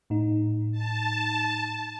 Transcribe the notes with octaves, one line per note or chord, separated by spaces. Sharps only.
A2 D#4
A5